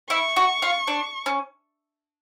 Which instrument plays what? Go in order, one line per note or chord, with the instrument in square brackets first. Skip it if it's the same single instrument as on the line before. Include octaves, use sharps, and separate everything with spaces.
[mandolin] E4 [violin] C#6
[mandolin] F#4
F4
D4
C#4